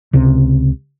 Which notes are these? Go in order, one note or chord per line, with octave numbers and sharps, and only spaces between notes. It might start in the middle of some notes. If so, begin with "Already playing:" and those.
C#2 C3